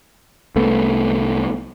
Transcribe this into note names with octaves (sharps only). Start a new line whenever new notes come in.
C2 A3 B3